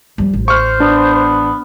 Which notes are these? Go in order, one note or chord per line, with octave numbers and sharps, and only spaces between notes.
F3 G3
A1
C5 C#6 F6
B3 D4